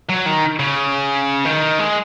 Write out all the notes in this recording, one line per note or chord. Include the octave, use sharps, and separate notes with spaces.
F#3
D#3
C#3
D#3
G#3